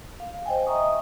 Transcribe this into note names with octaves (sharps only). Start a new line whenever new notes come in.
F5
C5 D#5 G5 G#5
D#5 E5 A#5 C#6 D#6